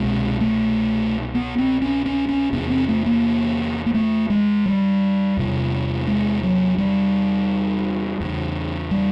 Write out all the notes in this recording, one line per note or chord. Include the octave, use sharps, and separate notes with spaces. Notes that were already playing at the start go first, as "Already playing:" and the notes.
Already playing: C2 B2 G#3
A3
B3
C4
C#4
C#4
C#4
E2 C3 B3
C4
A3
A#3
A#3
A3
G#3
G3
E2 C3
G#3
F#3
G3
E2 C#3
G3